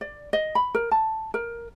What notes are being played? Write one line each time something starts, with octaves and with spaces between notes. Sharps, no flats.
D5
D#5
B5
A#4
A5
A#4